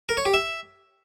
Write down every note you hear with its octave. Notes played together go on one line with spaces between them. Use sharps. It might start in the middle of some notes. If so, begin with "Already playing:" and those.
A#4
C#5
G4
E5